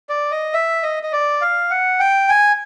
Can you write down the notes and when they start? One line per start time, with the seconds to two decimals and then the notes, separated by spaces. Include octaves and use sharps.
0.09 D5
0.31 D#5
0.54 E5
0.83 D#5
1.03 D#5
1.12 D5
1.41 F5
1.70 F#5
2.00 G5
2.29 G#5